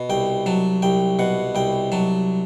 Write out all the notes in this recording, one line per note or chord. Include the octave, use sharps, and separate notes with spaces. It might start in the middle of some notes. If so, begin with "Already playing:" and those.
Already playing: B2
C2 G5
F#3 A5
C2 G5
B2 F#5
C2 G5
F#3 A5